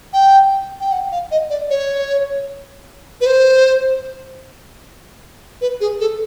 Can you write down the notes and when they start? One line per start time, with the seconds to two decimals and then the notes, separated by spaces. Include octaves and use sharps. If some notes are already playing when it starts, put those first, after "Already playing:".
0.13 G5
0.80 G5
0.92 F#5
1.12 F5
1.31 D#5
1.50 D5
1.70 C#5
3.21 B4
3.26 C5
5.61 B4
5.81 G#4
6.00 A4